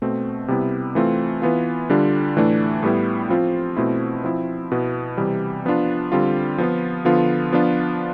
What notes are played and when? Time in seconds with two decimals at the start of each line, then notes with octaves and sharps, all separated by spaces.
0.02 B2 A3 C4
0.48 C3 G3 B3 E4
0.95 E3 A3 C4 F4
1.42 E3 B3 F4
1.90 D3 G3 D4 F4
2.37 A2 E3 A3 D4
2.83 A2 G3 B3 E4
3.30 F3 C4 F4
3.76 B2 A3 C4 E4
4.24 F3 C4 E4
4.71 B2 B3 E4
5.17 C3 E3 G3
5.65 F3 B3 D4 F4
6.12 D3 G3 C4 F4
6.58 F3 B3 F4
7.05 D3 F3 B3 F4
7.52 F3 B3 D4 F4